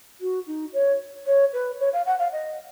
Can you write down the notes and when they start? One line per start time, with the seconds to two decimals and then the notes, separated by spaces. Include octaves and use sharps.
0.21 F#4
0.47 D#4
0.73 C#5
1.27 C#5
1.53 B4
1.80 C#5
1.93 F5
2.06 F#5
2.19 F5
2.32 D#5